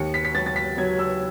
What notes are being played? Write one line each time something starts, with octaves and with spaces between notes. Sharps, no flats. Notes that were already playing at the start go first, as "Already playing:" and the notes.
Already playing: D#2 C#7
B6
B6
F#3 A6
A6
B6
F#3 G#6
E6